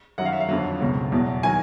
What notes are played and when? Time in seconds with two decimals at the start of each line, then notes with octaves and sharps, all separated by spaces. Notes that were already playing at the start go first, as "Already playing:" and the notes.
0.18 F#2 D#3 F#3 F#5
0.25 F5
0.32 E5
0.40 F5
0.49 F2 D3 F#3
0.81 C#2 B2 F#3
1.12 E2 B2 F#3
1.43 D#3 F#3 G#5